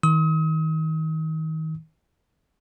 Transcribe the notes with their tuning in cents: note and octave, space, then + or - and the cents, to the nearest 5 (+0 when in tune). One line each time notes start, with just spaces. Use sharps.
D#3 +30 D#6 +40